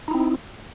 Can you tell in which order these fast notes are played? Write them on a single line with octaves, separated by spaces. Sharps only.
D#4 E4 C4